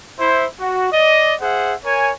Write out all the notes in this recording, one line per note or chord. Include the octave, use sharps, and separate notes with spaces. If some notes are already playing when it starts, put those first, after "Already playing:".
E4 C5
F#4
D5 D#5
G#4 C5 E5 F#5
A#4 C#5 G#5